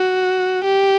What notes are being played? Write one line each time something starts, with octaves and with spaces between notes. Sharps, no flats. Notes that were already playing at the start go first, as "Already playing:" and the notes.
Already playing: F#4
G4